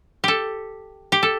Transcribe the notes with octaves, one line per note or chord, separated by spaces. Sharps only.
G4 A4
G4
A4